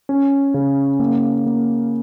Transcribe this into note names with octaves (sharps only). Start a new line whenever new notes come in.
C#4
C#3
A#3
A#3